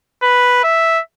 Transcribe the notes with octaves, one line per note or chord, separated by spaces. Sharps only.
B4
E5